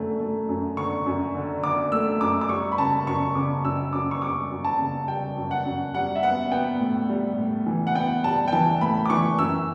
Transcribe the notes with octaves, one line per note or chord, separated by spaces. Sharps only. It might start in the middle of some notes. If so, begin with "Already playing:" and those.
Already playing: F#2 D3 A3
A3
F#2
D3 C#6
F#2
D3
D3 D6
A3 E6
F#2 D6
D6
G3 C#6
B5
C#3 A5
F#2 C#6
C#3 D6
F#2 E6
F#2 D6
C#6
G3 D6
F#2
A5
C#3
G3 G5
F#2
F#5
F#2
G3 F#5
E5
B3 F#5
B3 G5
A2
G3
A2
E3
F#5
B3 G5
G3 A5
G5
E3 A5
A2 B5
D6
E3 C#6
F#2 E6